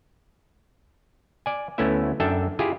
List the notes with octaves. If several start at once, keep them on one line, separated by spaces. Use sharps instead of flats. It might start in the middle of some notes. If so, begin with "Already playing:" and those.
D5 G#5
D2 A3 B3 C#4 E4 E5
F#2 D4 A4 E5 G5 A5
E4 F4 G4 G#4